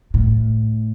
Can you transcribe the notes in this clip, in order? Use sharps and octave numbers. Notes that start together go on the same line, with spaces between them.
A2